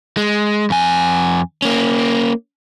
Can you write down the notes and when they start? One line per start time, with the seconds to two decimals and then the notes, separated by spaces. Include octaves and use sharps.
0.17 G#3
0.70 F2 G#5
1.62 A#3 C#4